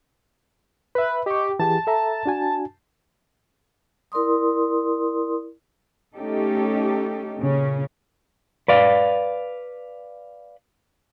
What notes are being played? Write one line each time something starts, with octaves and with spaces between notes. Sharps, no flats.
B4 E5 B5
G4 D#5 C#6
E3 G4 G#4 A5
A4 E5 A#5
D4 F#4 G#5
E4 A#4 D5 C6 D#6
A3 C#4 D#4 G4 A4
A#2 C#3 C#4
B4 D5 F5